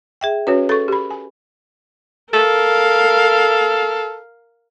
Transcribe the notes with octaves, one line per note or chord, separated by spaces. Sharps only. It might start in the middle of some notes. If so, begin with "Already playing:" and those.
G#4 E5 G5
C#4 F#4 B4 C#5
A4 C#6 A6
G4 B5
G#5
A4 A#4 F5